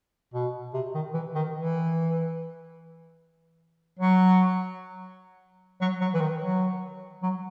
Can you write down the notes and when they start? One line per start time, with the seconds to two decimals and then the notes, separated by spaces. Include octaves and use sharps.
0.34 B2
0.74 C3
0.94 D#3
1.14 E3
1.35 D#3
1.56 E3
3.99 F#3
5.81 F#3
6.01 F#3
6.14 E3
6.21 D#3
6.41 F#3
7.23 F#3